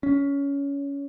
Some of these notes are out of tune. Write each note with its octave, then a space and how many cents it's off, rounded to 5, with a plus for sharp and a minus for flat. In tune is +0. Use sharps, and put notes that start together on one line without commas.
C#4 +20